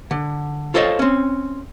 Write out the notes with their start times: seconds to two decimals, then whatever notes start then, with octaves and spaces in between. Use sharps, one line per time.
0.11 D3
0.74 F4 A4 C5 C#5 D#5 F5
0.99 C4 C#4